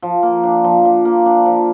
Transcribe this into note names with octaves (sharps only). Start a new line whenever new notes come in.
F3
A#3
D4
F3
F3
A#3
D4
F3